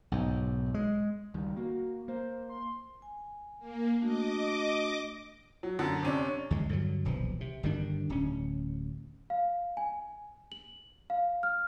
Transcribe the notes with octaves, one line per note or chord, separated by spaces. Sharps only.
B1 G#2
G#3
C#2 D#3 G3
A#3 F#4
A#3 C5
C6
G#5
A#3
A3 D4 F#4 D#5 D6
F#3
F#2 D3
C3 C#4 D4
D#2 D3 G#3
G2 D3 F3 F#3
D#1 B1 E3 F3
C3
G1 D#3 G3 D4
D1 C#4
F5
G#5
F#7
F5
F6